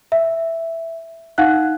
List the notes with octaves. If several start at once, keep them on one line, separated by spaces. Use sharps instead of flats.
E5
D#4 F5 F#5 F#6